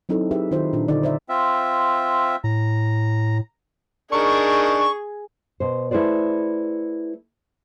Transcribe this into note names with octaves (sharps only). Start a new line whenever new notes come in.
F#3 C4 D#4 E4 A4
D#4 G4 G#4 B4 E5
D#3 D#4 F4 C5
A#2 D4
D3 D#4 D5
C5 D5 E5
C4 F4 E5
A2 A#5
D4 D#4 G#4 A#4 C#6
B2 C5
A3 E4 G#4 B4 C5 D5